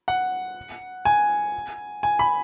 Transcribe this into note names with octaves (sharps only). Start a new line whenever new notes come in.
F#5
G#5
G#5
B5